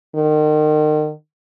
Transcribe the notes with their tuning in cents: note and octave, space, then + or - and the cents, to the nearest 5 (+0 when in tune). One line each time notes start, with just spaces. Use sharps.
D#3 -35